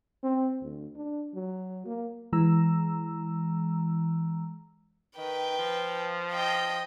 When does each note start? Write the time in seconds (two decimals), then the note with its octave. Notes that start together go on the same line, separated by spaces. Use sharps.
0.23 C4
0.62 D2
0.96 D4
1.35 F#3
1.86 A#3
2.33 E3 G#3 A#5 E6
5.18 D#3 B4 G5
5.58 F3
6.32 D#5 G5